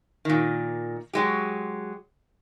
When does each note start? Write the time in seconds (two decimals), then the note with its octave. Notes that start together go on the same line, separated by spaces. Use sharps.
0.25 A#2 D#3
1.13 F#3 G#3 G4